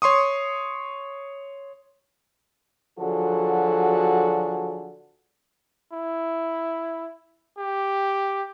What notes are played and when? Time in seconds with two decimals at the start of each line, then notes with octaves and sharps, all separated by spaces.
0.02 C#5 C6 C#6 D#6
2.99 D3 F3 F#3 F#4 G#4 A4
5.93 E4
7.58 G4